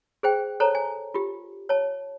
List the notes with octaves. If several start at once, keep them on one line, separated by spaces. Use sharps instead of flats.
G#4 C5 G5
A4 C5 C#5 A5 A#5
G#5
F4 G4
C#5 A5